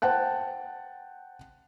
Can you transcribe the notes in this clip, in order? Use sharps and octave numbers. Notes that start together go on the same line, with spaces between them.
C5 F#5 G5 A5 F#6